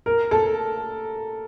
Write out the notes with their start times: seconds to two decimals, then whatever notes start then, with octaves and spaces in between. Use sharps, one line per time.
0.06 A#4
0.31 A4